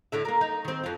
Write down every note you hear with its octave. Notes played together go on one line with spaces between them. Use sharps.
A2 D3 E5
A#3 A#4
D#4
D#3 C4
F2 F4